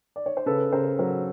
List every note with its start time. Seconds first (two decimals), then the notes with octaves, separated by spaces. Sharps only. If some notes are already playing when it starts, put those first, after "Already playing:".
0.16 D5
0.26 C#5
0.37 C5
0.46 C#3 A4 B4
0.72 C#3 A#4 C5
0.99 F#3 A#4 C5